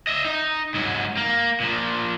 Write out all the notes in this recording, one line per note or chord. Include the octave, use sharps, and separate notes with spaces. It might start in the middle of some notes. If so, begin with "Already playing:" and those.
D#5 E5
D#4
G#2 F#3
A#3
A#2 F3